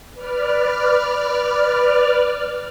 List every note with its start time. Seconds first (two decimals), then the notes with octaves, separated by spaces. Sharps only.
0.14 B4 D5 F6